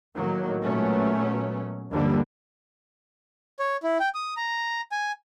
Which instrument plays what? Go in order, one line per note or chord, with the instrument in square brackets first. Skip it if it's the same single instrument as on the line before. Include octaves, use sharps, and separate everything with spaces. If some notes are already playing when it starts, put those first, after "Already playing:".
[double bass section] A2 D#3 F#3 A#3
A#2 F#3 G#3 A3 B3 C#4
G1 D#2 D3 F3 G3 A#3
[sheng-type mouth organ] C#5
E4
G5
D#6
A#5
G#5